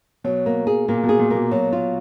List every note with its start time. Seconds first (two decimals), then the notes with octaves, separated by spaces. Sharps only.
0.24 B2 F#3
0.46 A#3
0.67 G#4
0.88 A#2 A#3
1.03 B2
1.09 G#4
1.19 A#2
1.30 B2 A#3
1.51 B2 F#3
1.73 F4